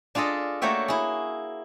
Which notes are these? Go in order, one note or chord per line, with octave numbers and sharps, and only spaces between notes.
D4 F4 G#4 A4 D#5
A3 A#3 F#4 C#5 E5 G5
E4 G#4